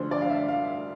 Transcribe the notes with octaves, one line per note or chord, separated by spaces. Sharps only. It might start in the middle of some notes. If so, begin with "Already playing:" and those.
Already playing: D2 D3 F3 C5
D5
F5
E5
F5